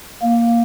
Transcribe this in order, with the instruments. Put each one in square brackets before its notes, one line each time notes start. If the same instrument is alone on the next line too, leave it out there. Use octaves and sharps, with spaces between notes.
[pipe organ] A#3